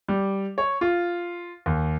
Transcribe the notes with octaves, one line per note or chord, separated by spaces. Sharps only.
G3
C#5
F4
D#2